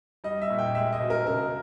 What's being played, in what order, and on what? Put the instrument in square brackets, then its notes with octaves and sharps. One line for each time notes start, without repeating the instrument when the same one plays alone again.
[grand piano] G3 D#5
E5
A#2
G5
G#3 E5
D#5
B2
A#4
C#3 A#4